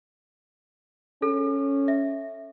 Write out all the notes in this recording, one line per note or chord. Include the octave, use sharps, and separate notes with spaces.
C#4 A4
E5